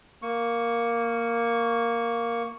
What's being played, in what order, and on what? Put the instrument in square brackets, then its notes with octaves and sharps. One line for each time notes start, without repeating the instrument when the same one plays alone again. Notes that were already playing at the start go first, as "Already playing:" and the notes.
[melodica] A#3 C#6